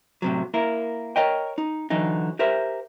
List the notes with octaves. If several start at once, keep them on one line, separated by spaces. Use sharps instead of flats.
A2 C3 F#3
A#3 E4 A#4
A#4 C#5 D#5 G5
D#4
D3 E3 F#3 D#4
G4 A#4 C5 E5